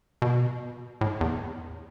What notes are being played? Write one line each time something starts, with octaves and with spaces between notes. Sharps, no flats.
B2
A2
E2